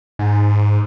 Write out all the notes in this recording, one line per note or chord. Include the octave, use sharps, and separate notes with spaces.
G#2